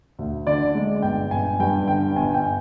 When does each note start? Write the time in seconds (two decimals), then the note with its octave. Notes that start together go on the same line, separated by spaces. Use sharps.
0.19 D2
0.47 D3 D5
0.75 G#3
1.02 G1 G5
1.31 G1 G#5
1.60 G2 G5
1.88 D3 G5
2.16 G1 G#5
2.34 G5